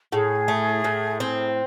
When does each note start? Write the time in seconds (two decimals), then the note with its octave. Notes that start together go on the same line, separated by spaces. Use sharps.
0.12 A2 G#4
0.48 A3
0.84 A2
1.20 C4